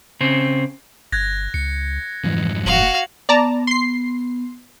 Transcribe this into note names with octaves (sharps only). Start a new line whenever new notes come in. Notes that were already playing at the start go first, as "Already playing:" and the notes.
C#3 C4
G1 F#6 G#6 A#6
C#2 C#7
F2 G#2 E3
E1 F#4 F5 F#7
B3 D5 A5 A#5
C6 C7